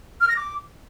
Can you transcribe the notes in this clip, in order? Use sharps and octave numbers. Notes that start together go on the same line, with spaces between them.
F6
A#6
D6